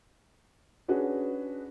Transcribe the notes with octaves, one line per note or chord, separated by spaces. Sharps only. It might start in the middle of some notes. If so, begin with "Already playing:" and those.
C#4 D4 F#4 G#4 B4